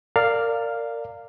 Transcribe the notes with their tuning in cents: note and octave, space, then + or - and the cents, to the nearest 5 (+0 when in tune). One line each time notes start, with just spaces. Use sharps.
A#4 -25 D5 +0 F5 +0